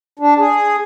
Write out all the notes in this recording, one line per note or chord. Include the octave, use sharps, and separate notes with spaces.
D4
G#4